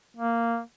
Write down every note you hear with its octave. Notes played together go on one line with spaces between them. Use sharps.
A#3